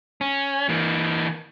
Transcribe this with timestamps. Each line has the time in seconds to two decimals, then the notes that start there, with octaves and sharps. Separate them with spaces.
0.21 C#4
0.69 E3 A#3